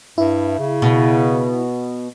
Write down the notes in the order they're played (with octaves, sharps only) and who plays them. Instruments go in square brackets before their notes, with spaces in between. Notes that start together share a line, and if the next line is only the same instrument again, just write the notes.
[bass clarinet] G2 [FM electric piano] E4
[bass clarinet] C#3
[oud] B2